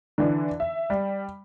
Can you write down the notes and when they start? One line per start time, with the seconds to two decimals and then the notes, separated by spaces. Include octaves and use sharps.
0.18 D3 E3 D4
0.60 E5
0.90 G3